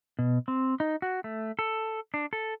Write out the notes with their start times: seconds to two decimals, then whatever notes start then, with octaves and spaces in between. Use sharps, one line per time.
0.19 B2
0.48 C4
0.80 D#4
1.02 F#4
1.24 A3
1.59 A4
2.14 D4
2.33 A4